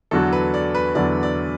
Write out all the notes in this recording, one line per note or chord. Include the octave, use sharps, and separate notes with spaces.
E2 D3 F#3 D4 F#4 A4
B4
D5
B4
E2 D3 F#3 D4 F#4 D5
D5